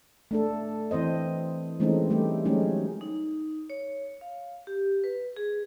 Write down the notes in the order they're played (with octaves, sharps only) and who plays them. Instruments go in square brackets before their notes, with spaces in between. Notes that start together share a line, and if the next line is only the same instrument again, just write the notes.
[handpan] A3 D4 A4
E3 C4 C5 D#5
E3 G#3 A3 C4 C#4 D#4
G3 A3 G4
F#3 G#3 A3 C#4 D#4
[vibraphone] D#4
C#5
F5
G4
B4
G#4